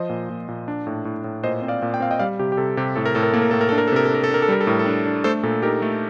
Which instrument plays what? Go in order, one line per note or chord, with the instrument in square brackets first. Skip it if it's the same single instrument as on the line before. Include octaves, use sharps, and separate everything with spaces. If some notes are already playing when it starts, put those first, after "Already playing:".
Already playing: [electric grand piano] F3 C5 D#5
A#2
A#2
A#2
D4
A2
A2
A2
A#2 C5 D#5
C4
D5 F5
A#2
G5
C4 F5
D#5 G5
G3 D5 F5
C3 G4
G4
C3 A4
C3 G4
A2 A4
A#4
A2 A4
A#4
A#3 A4
A#4
A2 A4
A#4
D4 A4
A#4
A4
C3 A#4
A4
D4 A#4
A4
D4 A#4
A4
G3 A#4
A4
A2 A#4
A4
D4
D4
A3 A4 C5
A#2 A4
D#4 G4 A#4
A3 A4